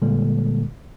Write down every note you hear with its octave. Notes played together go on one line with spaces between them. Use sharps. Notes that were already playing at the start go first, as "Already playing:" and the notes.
A#2 D3 G3 G#3 A#3 A4